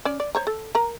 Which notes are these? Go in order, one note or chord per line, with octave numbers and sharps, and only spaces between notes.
C#4 D5
D5
C5 C#5 A#5
A4
A#4 A#5